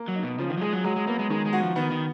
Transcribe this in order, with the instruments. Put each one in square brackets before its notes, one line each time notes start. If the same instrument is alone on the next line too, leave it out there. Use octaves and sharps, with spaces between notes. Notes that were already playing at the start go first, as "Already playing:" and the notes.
Already playing: [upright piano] A#3
[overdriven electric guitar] F#3
[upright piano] D#4
[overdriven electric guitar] B2
[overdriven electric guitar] C#3 [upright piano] F3
[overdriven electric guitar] D#3
F#3
[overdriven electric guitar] G#3 [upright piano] G#4
[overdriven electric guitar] F#3
[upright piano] F#3 [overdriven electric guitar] G#3
[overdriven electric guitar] G#3
[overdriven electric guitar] A#3 [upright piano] B3
[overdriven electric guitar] G#3
[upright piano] D#3 [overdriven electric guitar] G#3
[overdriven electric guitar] G#3
[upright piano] F#4
[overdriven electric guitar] F3
[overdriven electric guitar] D#3 [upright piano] B3
[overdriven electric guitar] D#3